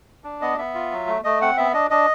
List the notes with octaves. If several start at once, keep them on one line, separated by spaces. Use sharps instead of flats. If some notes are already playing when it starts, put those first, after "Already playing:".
D4
B3 D#5
B3 E5
F4
F#3
A3
A3 D#5
C4 F#5
B3 E5
D4 D#5
D4 D#5